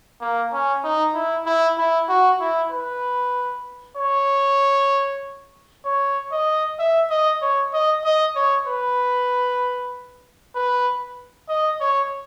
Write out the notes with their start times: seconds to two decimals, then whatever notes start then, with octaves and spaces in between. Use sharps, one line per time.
0.21 A#3
0.53 C#4
0.84 D#4
1.15 E4
1.46 E4
1.78 E4
2.09 F#4
2.41 E4
2.72 B4
3.97 C#5
5.85 C#5
6.32 D#5
6.79 E5
7.10 D#5
7.42 C#5
7.73 D#5
8.05 D#5
8.36 C#5
8.67 B4
10.55 B4
11.49 D#5
11.81 C#5